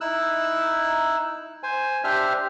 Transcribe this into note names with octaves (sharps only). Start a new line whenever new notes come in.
D#4 E4 E6 F#6
C5 G#5
D4 G4 C5 E5 F6